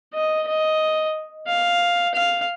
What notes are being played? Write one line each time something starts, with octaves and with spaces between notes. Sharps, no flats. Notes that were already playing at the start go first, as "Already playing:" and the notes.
D#5
D#5
F5
F5